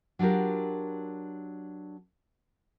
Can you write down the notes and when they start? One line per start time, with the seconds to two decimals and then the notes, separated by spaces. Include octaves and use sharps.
0.19 F#3 D4 F4 G4 A#4